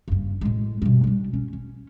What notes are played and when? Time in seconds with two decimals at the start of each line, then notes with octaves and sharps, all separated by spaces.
0.08 F#1 G2
0.41 A2 G#3
0.82 G2 B2
1.04 G3 D4
1.34 C#4
1.53 C#4